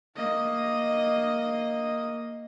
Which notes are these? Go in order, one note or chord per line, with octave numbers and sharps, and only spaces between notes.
A#3 D#5